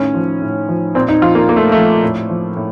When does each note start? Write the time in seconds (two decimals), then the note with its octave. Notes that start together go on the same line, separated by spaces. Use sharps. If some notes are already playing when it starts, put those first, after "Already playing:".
Already playing: A2 D#3 C#4
0.15 F3
0.42 A2
0.69 F3
0.95 A#2 C4
1.08 D#4
1.22 F3 F4
1.35 A#3
1.49 A#2 A#3
1.56 A3
1.72 F3 A3
2.02 A2
2.30 F3
2.57 A2